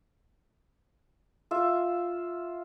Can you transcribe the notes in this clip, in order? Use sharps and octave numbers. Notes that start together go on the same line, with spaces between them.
F4 E5